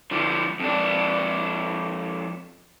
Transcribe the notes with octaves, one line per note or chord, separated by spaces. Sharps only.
D3 F3
F2 D4